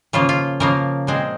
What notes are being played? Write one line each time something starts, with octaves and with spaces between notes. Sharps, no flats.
C#3 F3 A#3 F4
F4
C#3 F3 A#3 A#4
A#2 G#3 C4